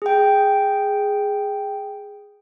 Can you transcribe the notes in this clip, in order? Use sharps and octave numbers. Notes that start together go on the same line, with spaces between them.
G#4 G5